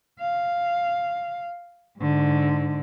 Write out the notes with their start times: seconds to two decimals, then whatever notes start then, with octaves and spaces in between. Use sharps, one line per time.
0.21 F5
1.99 G#2 D3